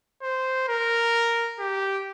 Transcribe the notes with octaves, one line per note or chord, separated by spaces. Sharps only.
C5
A#4
G4